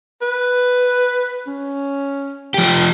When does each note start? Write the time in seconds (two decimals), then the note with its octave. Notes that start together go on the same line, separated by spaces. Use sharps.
0.22 B4
1.47 C#4
2.54 F3 G4